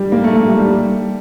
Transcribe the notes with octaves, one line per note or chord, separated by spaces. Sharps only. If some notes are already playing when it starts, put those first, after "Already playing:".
Already playing: G3
A#3
A3
A3
G3
G3